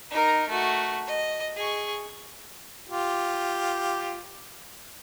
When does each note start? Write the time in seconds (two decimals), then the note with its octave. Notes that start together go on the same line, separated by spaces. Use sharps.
0.11 D#4 A#4
0.48 A3 F#4
1.07 D#5
1.56 G#4 C#6
2.88 F4 G4